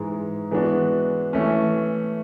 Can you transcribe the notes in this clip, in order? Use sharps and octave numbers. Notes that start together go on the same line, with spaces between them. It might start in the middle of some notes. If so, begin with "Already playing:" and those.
Already playing: G#2 E3 G#3
E3 G#3 B3 D4 F#4
E3 A3 C#4